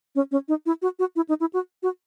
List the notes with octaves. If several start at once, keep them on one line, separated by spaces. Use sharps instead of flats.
C#4
C#4
D#4
E4
F#4
F#4
E4
D#4
E4
F#4
F#4